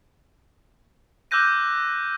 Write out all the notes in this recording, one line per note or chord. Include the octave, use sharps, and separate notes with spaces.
D6 E6 F#6 G6 A#6 D#7